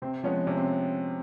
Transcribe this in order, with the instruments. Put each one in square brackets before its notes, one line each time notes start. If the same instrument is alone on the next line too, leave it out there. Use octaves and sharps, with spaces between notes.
[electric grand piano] C3 [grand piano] C4
[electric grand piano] F3 G#3 B3 [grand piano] C#4
[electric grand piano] C3 [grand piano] C#4
[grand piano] C4